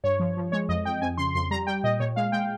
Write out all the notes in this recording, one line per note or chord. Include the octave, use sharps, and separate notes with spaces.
G2 C#5
F3
F3
G#3 C#5
F2 D#5
F2 G5
F2 G#5
C#3 C6
F2 C6
G3 A#5
G3 G5
A#2 D#5
A#2 C#5
G#3 F5
G#3 G5